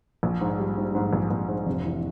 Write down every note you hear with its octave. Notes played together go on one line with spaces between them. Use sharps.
A#1
G#2
G3
G#2
G#2
A#1
A#1
G#2
F1
E3